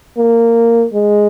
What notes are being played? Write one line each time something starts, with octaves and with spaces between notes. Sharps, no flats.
A#3
G#3